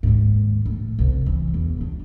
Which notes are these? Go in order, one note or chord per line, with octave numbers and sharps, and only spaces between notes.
D#2 G#2
A2
C2 C3
E3
E2
F#3 D4